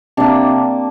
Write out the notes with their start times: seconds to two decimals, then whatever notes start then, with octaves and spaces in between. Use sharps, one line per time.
0.17 C3 A#3 D4